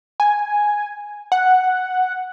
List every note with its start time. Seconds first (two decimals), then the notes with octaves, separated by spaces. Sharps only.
0.20 G#5
1.32 F#5